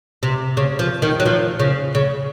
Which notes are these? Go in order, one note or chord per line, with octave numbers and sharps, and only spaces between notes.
C3
C#3
F3
D#3
F#3
F3
C#3
C#3